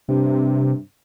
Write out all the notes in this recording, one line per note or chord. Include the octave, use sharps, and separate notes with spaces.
G2 C3